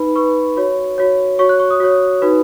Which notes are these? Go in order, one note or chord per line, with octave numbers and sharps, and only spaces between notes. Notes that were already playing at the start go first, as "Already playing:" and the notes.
Already playing: D#4 B4 B5
D#4 B4 C#6
F#4 C#5
F#4 C#5
F#4 C#5 C#6
F#6
C#6
D#6
F#4 C#5
D#4 F#4 B4